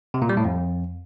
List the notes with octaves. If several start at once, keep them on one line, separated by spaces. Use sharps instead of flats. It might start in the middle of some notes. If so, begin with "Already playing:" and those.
C3
A#2
G3
A2
F2